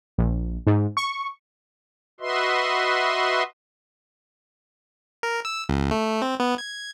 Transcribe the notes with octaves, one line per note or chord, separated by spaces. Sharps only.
A#1
G#2
C#6
F#4 B4 D#5 E5 C6
A#4
E6
C#2
A3
C4
B3
G#6